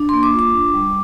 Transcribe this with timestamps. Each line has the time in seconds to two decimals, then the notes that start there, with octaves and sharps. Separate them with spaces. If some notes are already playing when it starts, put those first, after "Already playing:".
Already playing: D4
0.09 A#3 C6
0.23 D6
0.33 F4
0.39 D6
0.54 D4
0.74 G3